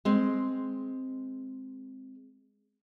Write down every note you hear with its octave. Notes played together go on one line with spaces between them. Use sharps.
G#3 C4